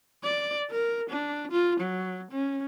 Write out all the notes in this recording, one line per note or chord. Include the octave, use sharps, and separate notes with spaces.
D5
A#4
D4
F4
F#3
C#4